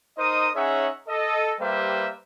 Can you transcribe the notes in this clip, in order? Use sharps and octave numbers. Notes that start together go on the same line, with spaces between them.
D#4 A#4 C5 D#5 D#6
C#4 D#4 G#4 C#5 E5 F#5
A4 D#5
G3 A#3 G4 B4 C5 E5